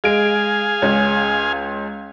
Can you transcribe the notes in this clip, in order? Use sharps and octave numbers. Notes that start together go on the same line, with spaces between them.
G#3 G#4 F5 G#5 D7
C#2 C#4